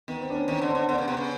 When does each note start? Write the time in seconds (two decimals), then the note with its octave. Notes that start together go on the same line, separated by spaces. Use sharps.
0.08 D#3 B3
0.21 C4
0.30 D4
0.34 B3 C#4
0.48 D#3 C4 D4
0.62 D3
0.68 C4
0.75 D3
0.89 D3 B3
0.98 C#3
1.08 C3 B3
1.17 C#3